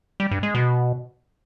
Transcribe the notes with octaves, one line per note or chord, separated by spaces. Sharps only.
G3
G2
G#3
B2